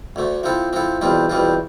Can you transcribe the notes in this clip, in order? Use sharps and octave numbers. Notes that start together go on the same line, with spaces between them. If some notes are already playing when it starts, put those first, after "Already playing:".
D2 D3 A3
F3 C4 E4 A4
F3 C4 E4 A4
E2 B2 G3 C4 F4
E2 B2 G3 C4 F4